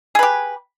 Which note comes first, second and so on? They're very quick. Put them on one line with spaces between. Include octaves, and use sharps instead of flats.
G#4 B4 G4